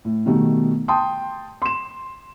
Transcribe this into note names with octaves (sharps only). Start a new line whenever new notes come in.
A2
B2 D#3 G3 A3
G5 A5 C6 D#6
C6 E7